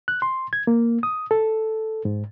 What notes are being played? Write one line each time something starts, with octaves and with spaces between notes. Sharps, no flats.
F#6
C6
G#6
A#3
D#6
A4
G#2